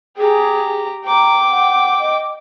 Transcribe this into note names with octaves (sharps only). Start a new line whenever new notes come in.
G4 G#4 A#5
G5 A#5 D6
F#5
D#5